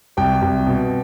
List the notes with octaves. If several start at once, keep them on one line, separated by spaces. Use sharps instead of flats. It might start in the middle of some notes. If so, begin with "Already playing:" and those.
C2 G5
C2
B2